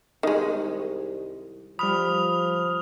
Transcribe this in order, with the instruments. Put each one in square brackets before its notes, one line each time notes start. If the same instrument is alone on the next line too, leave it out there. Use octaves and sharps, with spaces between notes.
[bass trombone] C2 [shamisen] D#3 G#3
[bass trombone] F3 [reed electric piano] G3 B5 [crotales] D#6 F6 F7